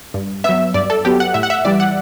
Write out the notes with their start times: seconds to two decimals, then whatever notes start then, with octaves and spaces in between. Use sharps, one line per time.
0.14 G2
0.44 F#3 B3 E5
0.74 G2 D5
0.90 A4
1.05 F#3 B3 G4
1.20 F#5
1.34 A2 E5
1.43 F#5
1.50 E5
1.65 E3 G3 D5
1.80 F#5